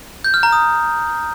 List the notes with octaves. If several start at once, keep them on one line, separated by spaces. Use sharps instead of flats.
G6
F6
A#5
D#6